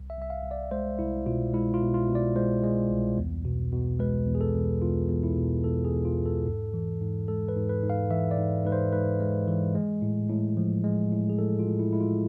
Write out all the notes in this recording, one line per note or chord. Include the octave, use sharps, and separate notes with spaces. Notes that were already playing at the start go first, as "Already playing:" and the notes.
Already playing: C2
E5
C2
E5
F5
C2
D5
G#3 C5
C2 E4
B2 F4
G#3 E4
F4
B2
F4
B2
D5
G#3 C5
G#3
C2
E2
B2
B2
G#3 B4
E2
G#4
A4
E2
E2 F4
E2
E4
B2
E2 A4
G#4
E2
F4
E2
A4
G#2
E3
G#2
G#3 A4
B4
G#2
B4
G#2
F5
E3 E5
D5
G#2
G#2 B4
C5
G#2 B4
G#3
E3
G#3
A2
A2
F3
G#3
A2
G#4
A2 A4
F4
A2
E4
G#3 E4
F4